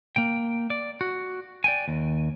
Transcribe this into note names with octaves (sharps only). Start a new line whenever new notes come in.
A#3 G5
D5
F#4
D5 G5 G#5
D#2